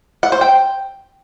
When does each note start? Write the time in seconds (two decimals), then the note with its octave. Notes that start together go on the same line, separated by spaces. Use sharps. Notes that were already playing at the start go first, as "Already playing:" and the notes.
0.23 F#5
0.32 C5
0.41 G5